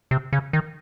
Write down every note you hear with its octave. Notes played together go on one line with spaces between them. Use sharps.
C3
C#3
D#3